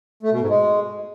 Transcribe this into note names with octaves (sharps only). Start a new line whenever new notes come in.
A3
B2
G#2
G#3